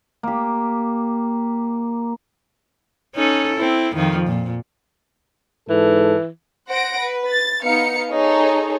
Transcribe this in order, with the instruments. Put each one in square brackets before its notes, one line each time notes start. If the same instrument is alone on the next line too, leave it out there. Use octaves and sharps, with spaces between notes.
[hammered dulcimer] A#3 G4
[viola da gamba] C#4 D#4 A4
C4 E4
F2 D#3 F3
A#2
[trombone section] G#2 A4 [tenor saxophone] E3
[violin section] C5 F#5 A#6 D7
B4
A6
B3 D#4 F5 C#7
D#4 G#4 A4 C#5